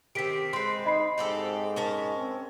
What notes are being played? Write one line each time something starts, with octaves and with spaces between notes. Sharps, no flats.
D#3 C4 G4 B6 D7
G#3 C4 B4 C6 C7
D#4 D#5 B5 C7
G#2 C4 G4 A4
C#4 A#4 A5
C4